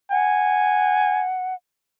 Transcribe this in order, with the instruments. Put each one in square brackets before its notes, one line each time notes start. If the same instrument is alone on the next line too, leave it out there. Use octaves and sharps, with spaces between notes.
[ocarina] F#5 [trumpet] G#5